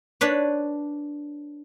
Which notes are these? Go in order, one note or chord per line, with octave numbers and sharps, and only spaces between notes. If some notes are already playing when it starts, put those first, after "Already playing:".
D4 B4 C#5